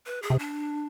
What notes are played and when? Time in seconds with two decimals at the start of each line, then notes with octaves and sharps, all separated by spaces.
0.06 B4
0.22 G#4
0.30 C3
0.39 D4